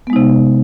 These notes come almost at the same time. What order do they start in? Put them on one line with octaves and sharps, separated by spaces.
B3 G#3 D#4 C3